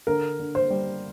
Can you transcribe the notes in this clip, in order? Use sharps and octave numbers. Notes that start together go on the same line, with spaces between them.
D3 A#4
D3
C5
G3